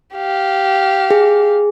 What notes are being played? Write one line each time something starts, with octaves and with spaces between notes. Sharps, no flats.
G4 F5
G#4